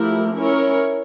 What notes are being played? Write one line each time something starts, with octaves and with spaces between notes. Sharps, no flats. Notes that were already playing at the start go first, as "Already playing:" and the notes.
Already playing: F3 A3 E4 G4 A#4
C#4 E4 A#4 C#5